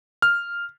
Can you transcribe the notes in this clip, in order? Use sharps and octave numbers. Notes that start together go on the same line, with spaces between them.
F6